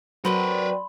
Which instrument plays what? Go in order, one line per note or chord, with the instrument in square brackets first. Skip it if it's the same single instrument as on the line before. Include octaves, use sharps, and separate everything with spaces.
[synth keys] F#3 [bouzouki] C4 D4 F#4 [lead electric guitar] A#4 B4 [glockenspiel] B5 C6